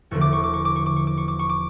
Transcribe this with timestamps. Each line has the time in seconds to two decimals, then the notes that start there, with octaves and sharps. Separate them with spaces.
0.11 E1 E2 D3 F3 A3 C#6
0.21 D6
0.33 C#6
0.44 D6
0.54 C#6
0.65 D6
0.76 C#6
0.86 D6
0.96 C#6
1.07 D6
1.17 C#6
1.28 D6
1.39 C#6
1.49 D6